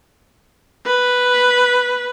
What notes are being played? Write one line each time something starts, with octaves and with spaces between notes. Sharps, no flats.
B4